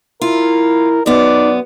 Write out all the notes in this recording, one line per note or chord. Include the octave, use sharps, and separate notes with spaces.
E4 F4 A#4
F#2 B3 D#4 D5